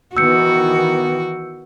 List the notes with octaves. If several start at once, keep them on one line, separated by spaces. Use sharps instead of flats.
D#3 E3 B3 F#4 E6 G6 C#7